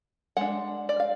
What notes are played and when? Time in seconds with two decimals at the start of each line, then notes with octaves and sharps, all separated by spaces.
0.37 G#3 D4 F#5
0.89 D5
1.00 F5